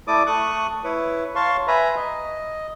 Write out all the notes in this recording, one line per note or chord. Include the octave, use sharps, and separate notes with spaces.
A3 E4 D5 D6 D#6
A3 C#6 D#6 F#6
E4 B4 C#5
C#5 F5 A5 C6 C#6
B4 E5 G#5 A#5 B5
D#5